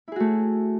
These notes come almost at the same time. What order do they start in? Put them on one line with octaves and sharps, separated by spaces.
E4 G#4 F#4 A3